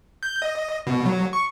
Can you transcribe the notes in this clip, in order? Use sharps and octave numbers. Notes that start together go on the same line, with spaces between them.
G6
D#5
B2
F#3
C#6